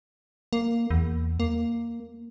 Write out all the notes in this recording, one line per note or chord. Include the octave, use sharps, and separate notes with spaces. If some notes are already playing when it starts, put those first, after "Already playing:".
A#3
E2
A#3